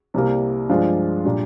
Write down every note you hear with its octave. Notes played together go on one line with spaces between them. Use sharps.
C2 C3 G3 A#3
G2 F3 G#3 D4 F4
A#2 G3 D4